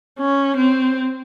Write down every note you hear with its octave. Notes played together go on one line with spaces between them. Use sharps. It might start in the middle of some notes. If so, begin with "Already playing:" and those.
C#4
C4